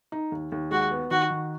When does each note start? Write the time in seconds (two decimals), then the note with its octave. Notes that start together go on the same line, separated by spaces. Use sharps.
0.12 D#4
0.32 D#2
0.52 D#2
0.71 G#3 F#4
0.91 B3
1.11 D#3 F#4
1.30 D#3